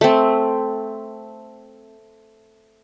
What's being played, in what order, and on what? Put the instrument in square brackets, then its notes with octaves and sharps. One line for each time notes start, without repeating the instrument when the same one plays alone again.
[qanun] A3 C4